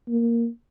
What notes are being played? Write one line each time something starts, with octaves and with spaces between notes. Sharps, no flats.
A#3